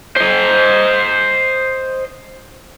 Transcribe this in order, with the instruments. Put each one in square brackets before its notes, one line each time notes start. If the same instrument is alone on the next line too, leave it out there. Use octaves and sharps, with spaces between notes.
[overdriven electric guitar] C5 D#5